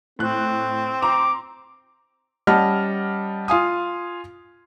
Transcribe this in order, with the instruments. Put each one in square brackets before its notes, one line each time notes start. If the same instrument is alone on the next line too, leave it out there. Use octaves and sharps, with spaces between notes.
[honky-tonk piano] A2 F#6 [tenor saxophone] C4
[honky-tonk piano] A#5 C6 [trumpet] D6
[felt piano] G3 C#4 D#5 F#5 A5 F6
F4 F5 G#5 D#6